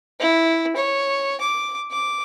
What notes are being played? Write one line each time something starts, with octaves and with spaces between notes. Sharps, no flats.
E4
C#5
D6
D6